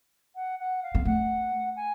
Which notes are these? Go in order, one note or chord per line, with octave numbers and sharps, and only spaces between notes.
F#5
F#5
F5
B3
A3 F#5
G#5